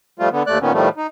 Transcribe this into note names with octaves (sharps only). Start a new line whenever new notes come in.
F3 G3 A3 F4
D3 B3
D#2 A3 D5 F#6
A#2 D#3 B3 C#4
A2 D#3 F3 G3 A3
D#4